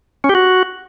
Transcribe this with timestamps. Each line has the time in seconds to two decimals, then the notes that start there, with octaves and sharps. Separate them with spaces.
0.24 C#4
0.29 G4
0.35 F#4